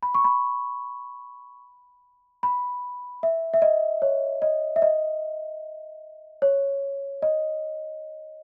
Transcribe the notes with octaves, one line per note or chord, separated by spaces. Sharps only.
B5
C#6
B5
B5
E5
E5
D#5
C#5
D#5
E5
D#5
C#5
D#5